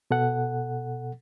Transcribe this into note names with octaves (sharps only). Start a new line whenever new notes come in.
B2 A4 F#5